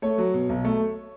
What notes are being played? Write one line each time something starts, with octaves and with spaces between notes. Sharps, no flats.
A3 C#5
F#3
B2
B1
A3